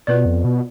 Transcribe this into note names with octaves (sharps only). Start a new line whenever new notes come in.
B2 B3 F4 B4 D5
F2
B2